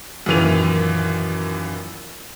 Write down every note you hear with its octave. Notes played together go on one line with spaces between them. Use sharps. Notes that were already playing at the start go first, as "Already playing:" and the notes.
F#2 A#2 D#3 E3 D#7 F7